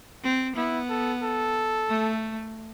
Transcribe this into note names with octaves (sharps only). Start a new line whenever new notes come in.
C4
B3 E4
A4
A4
A3